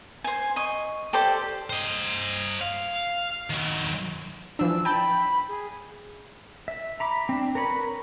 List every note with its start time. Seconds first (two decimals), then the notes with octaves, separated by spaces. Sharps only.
0.24 C5 G#5
0.56 D#5 C#6
1.13 G4 A4 C5 D5
1.70 C5 D#5
2.61 F5
3.50 D#3 F#3
4.59 E3 F3 D4 E6
4.85 G5 A5 B5
5.48 G#4
6.68 E5
7.00 A#5 B5 D6
7.29 C4 D4
7.55 A#4 B4 C#5 B5